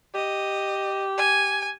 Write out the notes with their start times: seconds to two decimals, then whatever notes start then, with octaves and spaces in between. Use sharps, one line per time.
0.15 G4 D#5
1.17 G#5